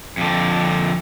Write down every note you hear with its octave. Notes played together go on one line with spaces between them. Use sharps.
F2 D3